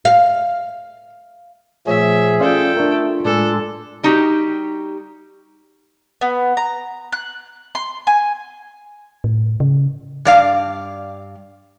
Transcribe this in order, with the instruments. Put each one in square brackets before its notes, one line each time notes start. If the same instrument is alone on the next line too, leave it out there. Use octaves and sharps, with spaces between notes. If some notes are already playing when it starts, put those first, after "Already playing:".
[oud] F5
[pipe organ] A#2 F3 A3 [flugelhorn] G#4 [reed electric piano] C#5 [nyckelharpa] E5
[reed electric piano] C#4 D5 F5 [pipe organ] F4 [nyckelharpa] A4 G5
[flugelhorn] A3 [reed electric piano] D4 A#4
[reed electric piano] A2 G#3 G#5 [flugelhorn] D4 [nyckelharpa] A4
[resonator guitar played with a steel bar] G3 D#4 F#4 G4
[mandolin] B3
A#5
F#6
C6
G#5
[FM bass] A2
C#3
[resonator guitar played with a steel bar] G2 D5 F5